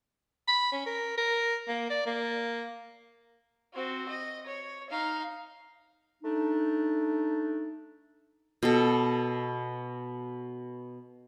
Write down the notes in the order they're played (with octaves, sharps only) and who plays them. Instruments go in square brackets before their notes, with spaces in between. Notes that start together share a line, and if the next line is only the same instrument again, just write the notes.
[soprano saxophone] B5
C#4
A#4
A#4
A#3
D5
A#3
[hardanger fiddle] C4 F#4
D#5
C#5
D#4 F5
[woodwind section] A3 D4 D#4
[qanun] B2 A4